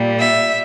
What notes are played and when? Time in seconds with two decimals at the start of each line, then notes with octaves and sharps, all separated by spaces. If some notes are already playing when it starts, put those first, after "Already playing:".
Already playing: A#2 G3
0.19 E5